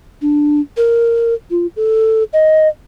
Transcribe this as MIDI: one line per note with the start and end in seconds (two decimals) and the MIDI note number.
0.22 0.60 62
0.77 1.34 70
1.51 1.67 65
1.76 2.24 69
2.33 2.68 75